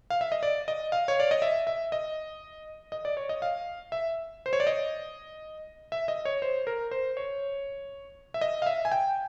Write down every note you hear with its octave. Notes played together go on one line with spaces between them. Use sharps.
F5
E5
D#5
D5
D#5
F5
C#5
D5
D#5
E5
E5
D#5
D#5
D5
C#5
D#5
F5
E5
C5
C#5
D5
D#5
E5
D#5
C#5
C5
A#4
C5
C#5
E5
D#5
F5
E5
G#5
G5